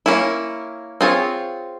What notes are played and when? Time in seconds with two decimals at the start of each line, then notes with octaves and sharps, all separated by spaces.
0.06 A#3 C#4 E4
1.01 C4 F4 G#4 C#5